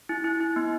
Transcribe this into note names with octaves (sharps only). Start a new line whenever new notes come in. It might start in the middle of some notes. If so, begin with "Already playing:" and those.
E4
E4
E4
B3